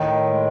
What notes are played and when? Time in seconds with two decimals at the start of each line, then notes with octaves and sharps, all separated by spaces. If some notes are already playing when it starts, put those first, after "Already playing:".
Already playing: A2 D#3
0.29 G#3